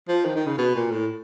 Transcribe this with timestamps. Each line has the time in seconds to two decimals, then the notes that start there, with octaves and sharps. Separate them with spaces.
0.08 F3
0.25 D#3
0.36 D#3
0.47 C#3
0.58 B2
0.75 A#2
0.91 A2